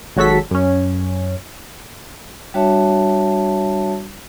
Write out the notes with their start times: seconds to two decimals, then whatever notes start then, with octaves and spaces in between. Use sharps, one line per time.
0.16 G#1 F#3 F#4 A4 B6
0.51 F#2 C#4
2.54 G3 D4 F#4 C#5 E5 A5